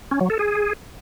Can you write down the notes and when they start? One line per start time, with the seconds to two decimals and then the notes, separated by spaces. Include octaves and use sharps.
0.11 C#4
0.21 F#3
0.30 A4
0.39 G#4